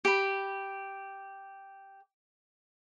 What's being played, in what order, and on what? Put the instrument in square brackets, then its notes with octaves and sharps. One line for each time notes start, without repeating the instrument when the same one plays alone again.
[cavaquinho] G4 B5